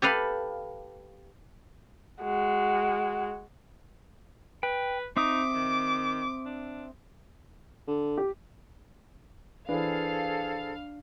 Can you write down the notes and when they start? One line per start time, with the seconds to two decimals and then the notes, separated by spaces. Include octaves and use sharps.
0.02 G4 A4 B4 F5
2.22 G#3 F#4
4.63 B4 G5
5.16 C4 D#4 E5 D6 D#6
5.54 D#3
6.45 D4
7.88 D3
8.17 G4
9.69 E3 D4 G#4 A4 C5 F5